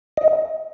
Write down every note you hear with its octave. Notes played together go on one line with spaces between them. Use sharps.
D#5